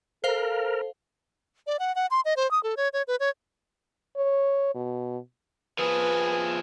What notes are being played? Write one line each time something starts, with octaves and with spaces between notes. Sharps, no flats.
A4 A#4 C5 F5
D5
F#5
F#5
C6
D#5
C5
D#6
A4
C#5
C#5
B4
C#5
C#5
B2
F3 G#4 B4